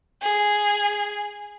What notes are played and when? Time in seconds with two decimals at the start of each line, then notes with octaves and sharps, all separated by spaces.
0.22 G#4